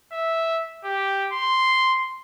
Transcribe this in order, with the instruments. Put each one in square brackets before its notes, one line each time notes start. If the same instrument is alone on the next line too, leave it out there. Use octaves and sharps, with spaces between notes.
[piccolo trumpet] E5
G4
C6